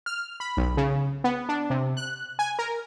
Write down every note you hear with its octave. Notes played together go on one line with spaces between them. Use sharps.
F6
B5
B1
C#3
B3
D4
C3
F#6
G#5
A#4